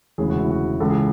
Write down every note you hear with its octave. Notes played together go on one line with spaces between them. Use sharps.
E1 D2 C#3 E3 G#3 G#4
F#4
E4
F#4
C#2 C#3 E3 G#3 A4
G#4